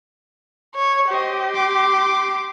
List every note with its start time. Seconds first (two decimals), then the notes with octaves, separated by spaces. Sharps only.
0.76 C#5
1.10 G4 C5 D#5
1.54 C6 D6